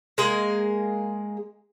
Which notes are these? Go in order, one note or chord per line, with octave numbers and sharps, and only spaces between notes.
G#3 A#3 G#4